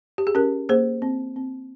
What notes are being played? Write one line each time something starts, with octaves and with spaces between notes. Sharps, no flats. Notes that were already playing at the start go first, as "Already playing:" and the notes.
G4
G#4
C#4 G4 A#4
A#3 G#4 C5
C4
C4